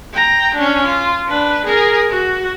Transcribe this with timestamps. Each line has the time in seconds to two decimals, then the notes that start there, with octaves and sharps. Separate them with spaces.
0.14 G5 A#5
0.55 C#4 D4
0.85 F4
1.28 D4 B4
1.66 G#4 A#4
2.10 F#4